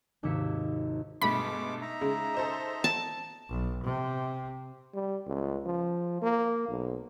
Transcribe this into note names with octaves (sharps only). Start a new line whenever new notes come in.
G#1 D#2 C3 E6 B6 C#7
G2 B2 G#3 A3 B5 D6
D#4 E5 A#5
C#3 G#3
A4 C5 D#5
A5
B1
C3
G3
C#2
F3
A#3
B1